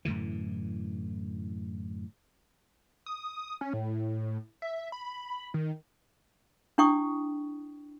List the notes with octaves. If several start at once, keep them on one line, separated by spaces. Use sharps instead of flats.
F#2 A2 D3 E3
D#6
C#4
A2
E5
B5
D#3
D4 E4 G5 C#6 D#6